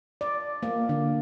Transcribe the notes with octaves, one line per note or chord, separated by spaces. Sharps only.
D5
A#3
D3